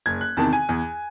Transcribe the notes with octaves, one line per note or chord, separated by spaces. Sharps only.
F#1 G#6
F#6
E2 C3 D#3 A5
G#5
E2